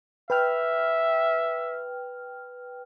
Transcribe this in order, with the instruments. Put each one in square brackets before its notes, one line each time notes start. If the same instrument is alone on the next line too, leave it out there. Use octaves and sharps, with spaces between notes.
[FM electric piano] B4 G5 F6 [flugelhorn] E5